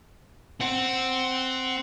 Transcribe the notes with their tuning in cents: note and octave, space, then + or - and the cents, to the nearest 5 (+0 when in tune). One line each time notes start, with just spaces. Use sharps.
C4 +0 F#5 +15